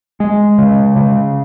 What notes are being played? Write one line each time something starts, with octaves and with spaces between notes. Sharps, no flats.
G#3
C#3
C#3